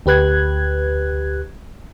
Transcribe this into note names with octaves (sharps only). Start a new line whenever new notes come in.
D2 G4 B4 F#6 G#6